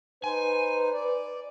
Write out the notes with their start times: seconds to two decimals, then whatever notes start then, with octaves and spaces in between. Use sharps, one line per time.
0.24 D#4 B4 C5 G#5
0.93 D5